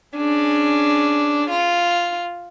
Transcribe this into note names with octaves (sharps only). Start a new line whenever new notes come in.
C#4 D4 G#4
F4